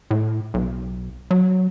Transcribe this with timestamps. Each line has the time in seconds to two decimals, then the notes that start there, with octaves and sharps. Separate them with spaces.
0.11 A2
0.54 B1
1.31 F#3